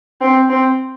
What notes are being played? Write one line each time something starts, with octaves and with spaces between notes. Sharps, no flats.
C4
C4